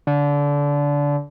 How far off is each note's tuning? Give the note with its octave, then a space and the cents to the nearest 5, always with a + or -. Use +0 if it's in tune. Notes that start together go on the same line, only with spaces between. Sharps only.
D3 -25